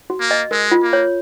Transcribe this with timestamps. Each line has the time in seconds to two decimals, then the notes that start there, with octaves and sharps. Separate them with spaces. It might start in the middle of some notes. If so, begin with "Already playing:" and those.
0.10 F#4
0.20 A#3
0.31 D#5
0.51 G#3 A#4
0.72 F4
0.82 A#3
0.93 C#5